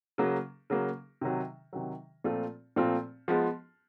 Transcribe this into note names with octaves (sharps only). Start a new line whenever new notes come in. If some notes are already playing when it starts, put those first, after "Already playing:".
C#3 F#3 A#3
C#3 F#3 A#3
C3 D#3 F#3
C3 D#3 F#3
A#2 F3 A3 C4 F4
A#2 F3 A3 C4 F4
F3 G#3 B3